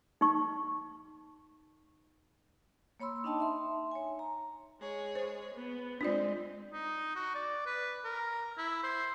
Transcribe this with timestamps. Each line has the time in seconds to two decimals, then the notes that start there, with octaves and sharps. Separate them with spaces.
0.21 D#4 C#6
3.00 A#3 C#5 B5 C6 E6
3.24 D4 D#4 D#5 G5 A5 C6
3.38 D#4 E5 C6
3.91 C#5 G#5
4.19 A#5
4.80 G#3 G#4 C#5
5.15 C5
5.54 B3
6.01 G#3 C4 D4 F4 D5
6.73 D#4
7.16 F#4
7.35 D5
7.66 B4
8.04 A#4
8.58 E4
8.83 C5